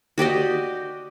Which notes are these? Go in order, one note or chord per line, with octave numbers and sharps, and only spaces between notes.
F#4 G4 D5 D#5